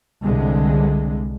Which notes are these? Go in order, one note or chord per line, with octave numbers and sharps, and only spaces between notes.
C2 D3 G#3